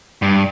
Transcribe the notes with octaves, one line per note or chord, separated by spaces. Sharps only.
G2